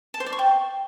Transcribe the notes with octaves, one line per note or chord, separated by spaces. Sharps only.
A5
C5
D5
C#6
G5